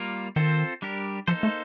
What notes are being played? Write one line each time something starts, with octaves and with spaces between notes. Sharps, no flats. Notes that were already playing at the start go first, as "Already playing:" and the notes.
Already playing: G3 A#3 F4 A#4
D#3 C4 F4 A4 C5
G3 D4 G4 A#4
F3 A#3 D#4 A4 C5
A3